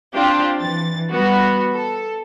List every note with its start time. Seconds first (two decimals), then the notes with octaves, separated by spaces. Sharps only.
0.14 C4 D4 F4 G4
0.59 E3 A6
1.09 G3 B3 F#4
1.73 A4